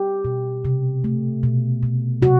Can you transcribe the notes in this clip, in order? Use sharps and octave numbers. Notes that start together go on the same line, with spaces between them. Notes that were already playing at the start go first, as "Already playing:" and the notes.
Already playing: G4
B2
C3
A3
B2
B2
C3 F#4